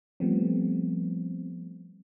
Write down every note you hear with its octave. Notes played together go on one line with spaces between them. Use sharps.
F3 G3 A3 B3 C4